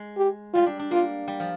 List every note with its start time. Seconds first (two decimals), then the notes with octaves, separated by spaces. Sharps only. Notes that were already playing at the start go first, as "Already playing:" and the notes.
Already playing: G#3
0.17 G4
0.54 G3 F4
0.66 D4
0.79 D4
0.91 A#3 F4
1.28 G3
1.40 F3